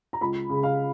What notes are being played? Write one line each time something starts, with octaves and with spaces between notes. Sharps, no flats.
A#5
C#2 B5
C#3
F5